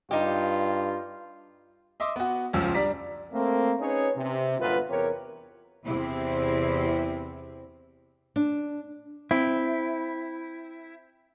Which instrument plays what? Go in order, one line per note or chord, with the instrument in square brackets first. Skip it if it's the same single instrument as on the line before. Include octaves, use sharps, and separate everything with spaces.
[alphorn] G2 [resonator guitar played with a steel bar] D#4 G4 [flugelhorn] F4
[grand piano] D#5 E5 C6 D6 D#6
B3 F#4
F#1 C#2 F3 C#4 E6
G3 D4 D5 A#5 D6 B6
[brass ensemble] A3 A#3 C4
C#4 D#4 G#4 B4 C#5
C3
G1 F#2 A#2 B3 F4 B4
E2 C3 G4 A#4 C#5
[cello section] E2 C3 C4 E4
[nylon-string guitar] D4
[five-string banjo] C4 [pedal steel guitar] E4